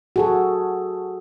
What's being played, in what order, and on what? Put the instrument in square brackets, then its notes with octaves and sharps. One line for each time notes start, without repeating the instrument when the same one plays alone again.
[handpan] F#4 G#4 A4